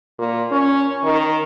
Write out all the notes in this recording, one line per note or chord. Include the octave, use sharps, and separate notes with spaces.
A#2
C#4
D#3